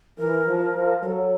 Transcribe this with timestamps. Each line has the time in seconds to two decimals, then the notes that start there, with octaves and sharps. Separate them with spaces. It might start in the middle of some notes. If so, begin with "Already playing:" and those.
0.18 E3 A#4
0.46 F3
0.75 F3
1.02 F#3 A4 A#4